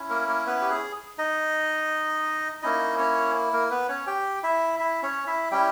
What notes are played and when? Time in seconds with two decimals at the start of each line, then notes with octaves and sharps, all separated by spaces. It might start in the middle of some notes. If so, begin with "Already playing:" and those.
Already playing: C#4 E4
0.10 A#3 A#4
0.28 A#3 A#4
0.46 B3 B4
0.62 G4
0.70 G#4
1.18 D#4 D#5
2.62 A#3 C#4 D#4 E4 D#5
2.98 C#4 C#5
3.53 A#3 A#4
3.71 B3 B4
3.89 C#4 C#5
4.07 G4 G5
4.43 E4 E5
4.79 E4 E5
5.02 C#4 C#5
5.27 E4 E5
5.51 G3 C#4 E4 G4 G5